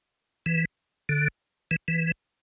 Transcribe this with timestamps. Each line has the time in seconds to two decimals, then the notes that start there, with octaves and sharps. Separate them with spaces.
0.46 E3
1.09 D3
1.71 E3
1.88 E3